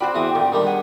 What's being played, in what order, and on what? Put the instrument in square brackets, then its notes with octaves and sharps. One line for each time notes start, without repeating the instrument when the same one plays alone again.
[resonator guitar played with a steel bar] C4 F#4 D5 [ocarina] G5 [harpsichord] B5
[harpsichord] E2 E3 D#6
[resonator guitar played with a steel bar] A#2 [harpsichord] D3
[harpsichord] D#3 G3 D4
[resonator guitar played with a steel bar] G#4 F#5